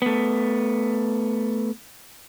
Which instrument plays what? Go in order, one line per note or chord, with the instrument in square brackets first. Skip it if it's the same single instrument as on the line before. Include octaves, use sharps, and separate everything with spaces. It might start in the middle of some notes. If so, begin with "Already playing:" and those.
[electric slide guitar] A3 B3